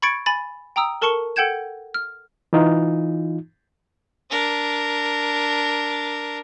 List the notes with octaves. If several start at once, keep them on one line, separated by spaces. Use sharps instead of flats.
B5 C#6 G#6 A6 C#7 D7
G#5 B5 A6
G5 A#5 D#6 E6
A4 A#4 A5 C#6 C#7 G7
A4 F#5 G5 G6 G#6 E7
F6
E3 D#4 F4
D4 A#4